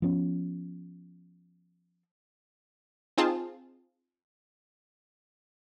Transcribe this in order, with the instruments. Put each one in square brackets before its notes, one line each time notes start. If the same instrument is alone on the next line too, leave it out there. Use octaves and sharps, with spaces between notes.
[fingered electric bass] F3 B3 C#4
[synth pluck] C4 D#4 F4 G#4 A5